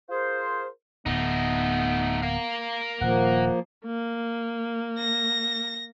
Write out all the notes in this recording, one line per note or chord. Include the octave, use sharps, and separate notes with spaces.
F4 G#4 A#4 C5
D1 A3 B3 D#4
A#4 F5
D#1 F3 A#3 F#5
A#3
A#6